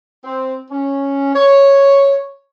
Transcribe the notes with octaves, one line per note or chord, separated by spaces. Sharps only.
C4
C#4
C#5